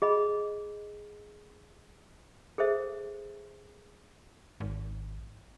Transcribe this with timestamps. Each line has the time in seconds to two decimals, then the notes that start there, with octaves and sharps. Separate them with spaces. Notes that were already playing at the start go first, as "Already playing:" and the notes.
0.02 G#4 D#5 B5
2.58 G#4 A4 C5 E5
4.60 G#1